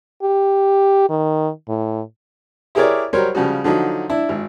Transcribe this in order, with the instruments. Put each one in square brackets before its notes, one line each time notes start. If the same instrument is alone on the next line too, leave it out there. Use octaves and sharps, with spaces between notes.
[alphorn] G4
D#3
A2
[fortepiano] E4 G4 G#4 A#4 C#5 D5
F#3 G3 A#4 C5 C#5
C#3 F3 G3 F#4
D3 F3 F#3 D#4
D4 E4
G#1